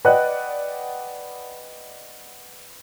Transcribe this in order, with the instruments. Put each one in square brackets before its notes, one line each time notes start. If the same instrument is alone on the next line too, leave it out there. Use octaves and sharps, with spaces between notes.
[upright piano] B4 D5 D#5 F#5 G5 F#6